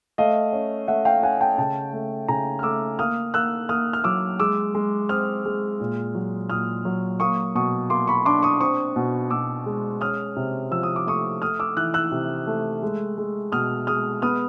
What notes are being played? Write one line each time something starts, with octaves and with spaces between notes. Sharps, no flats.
A3 D#5 F5
C#4
A3 E5 F#5
F5 G5
C#4 F#5 G#5
G5 A5
C#3 G5 A5
A3
C#3 G#5 A#5
F6
A3 D6 E6
A#3 D#6 F6
A#3 E6 F#6
A#3 D#6 F6
F6
F#3 D6 E6
G#3 D6 E6
G#3
C4 D#6 F6
G#3
A#2
F#3
A#2 D#6 F6
F#3
A#3 C#6 D#6
B2 C#6 D#6
A#3 C6 D6
B5 C#6
D4 C6 D6
C#6 D#6
C4 C#6 D#6
B2
B2 D6 E6
G#3
C#4 D#6 F6
C3
F3 E6
D#6
D6
A3 C#6 D#6
A3 D#6 F6
D6 E6
E3 E6 F#6
E6 F#6
C3
A3
G#3
G#3
B2 D#6 F6
G#3 D#6 F6
B3 D#6 F6